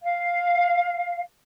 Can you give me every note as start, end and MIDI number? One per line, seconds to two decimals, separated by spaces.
0.02 1.20 77